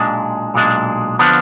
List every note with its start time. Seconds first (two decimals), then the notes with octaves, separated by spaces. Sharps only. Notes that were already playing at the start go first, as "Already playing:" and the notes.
Already playing: B1 A#2 G#3 D4
0.54 B1 A#2 G#3 D4
1.19 D3 F3 B3 D4